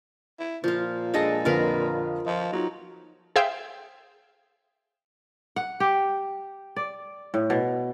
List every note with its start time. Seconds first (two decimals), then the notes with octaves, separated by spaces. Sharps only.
0.40 E4
0.64 A#2 F3 F4
1.14 G#3 D4 G#4 A4 D#5
1.45 F2 D3 F4 A#4 B4
2.26 F3 D#5
2.52 F#3 D#4 F4
3.36 G#4 C5 E5 F5 G5
5.56 F#5
5.80 G4
6.76 D5
7.34 A2
7.50 B2